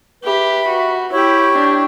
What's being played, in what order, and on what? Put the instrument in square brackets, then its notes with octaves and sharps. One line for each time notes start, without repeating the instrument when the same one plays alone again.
[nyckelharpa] G4 [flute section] B4 E5 B5
[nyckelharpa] F#4
[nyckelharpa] E4 [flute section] G4 C#5 G5 C#6
[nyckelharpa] D4